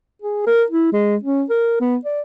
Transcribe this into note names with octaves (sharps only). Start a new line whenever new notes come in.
G#4
A#4
E4
G#3
C#4
A#4
B3
D5